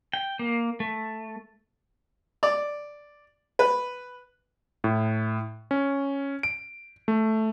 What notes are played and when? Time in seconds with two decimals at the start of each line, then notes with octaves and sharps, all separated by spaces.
0.13 G5
0.39 A#3
0.80 A3
2.43 D5
3.59 B4
4.84 A2
5.71 C#4
6.43 D7
7.08 A3